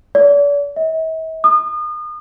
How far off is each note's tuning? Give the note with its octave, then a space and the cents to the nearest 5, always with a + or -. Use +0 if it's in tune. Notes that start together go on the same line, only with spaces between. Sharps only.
D5 -40
E5 -45
D#6 -35